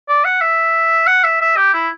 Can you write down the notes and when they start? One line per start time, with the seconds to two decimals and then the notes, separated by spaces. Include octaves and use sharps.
0.09 D5
0.25 F#5
0.41 E5
1.07 F#5
1.24 E5
1.41 E5
1.57 G4
1.74 E4